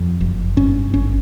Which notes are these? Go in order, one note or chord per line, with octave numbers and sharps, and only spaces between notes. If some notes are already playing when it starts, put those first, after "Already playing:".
Already playing: F2
F#1
G2 C#4
G#1 C#4